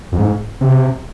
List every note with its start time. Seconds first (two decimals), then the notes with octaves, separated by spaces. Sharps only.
0.12 F2
0.19 G#2
0.61 C3